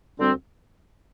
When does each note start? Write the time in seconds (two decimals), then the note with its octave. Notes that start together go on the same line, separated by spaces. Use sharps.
0.19 D2 D3 G3 C4